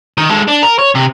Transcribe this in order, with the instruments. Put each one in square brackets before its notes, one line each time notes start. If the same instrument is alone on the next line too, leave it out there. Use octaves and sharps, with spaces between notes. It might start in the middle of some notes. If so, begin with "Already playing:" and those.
[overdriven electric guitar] D#3
G#3 A4
D4
A#4
C#5
C3